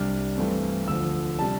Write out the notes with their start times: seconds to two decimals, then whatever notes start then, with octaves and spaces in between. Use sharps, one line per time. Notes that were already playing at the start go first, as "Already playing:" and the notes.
Already playing: C2 C3 G3 D4 F6
0.37 G2 E3 A3 C4
0.87 D2 D3 F3 E6
1.39 C3 G3 D4 A5